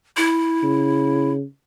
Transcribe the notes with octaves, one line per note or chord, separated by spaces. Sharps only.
E4
C#3